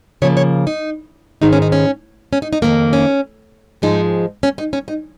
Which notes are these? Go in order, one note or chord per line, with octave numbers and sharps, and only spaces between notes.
C#3 F3 A#3 C#5
C#5
D#4
G#2 D#3 G#3 D#4
C#4
D#4
C#4
C#4
D#4
D#4
F2 D#3 A#3
C#4
G#2 F3 G#3 D#4
C#4
D#4
C#4
D#4